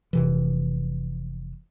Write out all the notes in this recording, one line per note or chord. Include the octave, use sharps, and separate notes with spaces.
F1 C3 E3